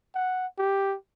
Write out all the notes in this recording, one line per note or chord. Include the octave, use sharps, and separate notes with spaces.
F#5
G4